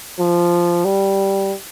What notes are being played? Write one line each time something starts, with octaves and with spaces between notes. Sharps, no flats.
F3
G3